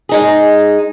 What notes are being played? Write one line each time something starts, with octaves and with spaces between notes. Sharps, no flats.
G#3 D#4 G#4